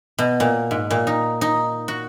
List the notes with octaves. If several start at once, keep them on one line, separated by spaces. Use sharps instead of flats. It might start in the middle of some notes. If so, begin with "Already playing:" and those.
B2
A#2
G#2
A#2
D#4
D#4
F#4